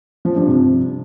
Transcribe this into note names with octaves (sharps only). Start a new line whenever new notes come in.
F3
G2
C3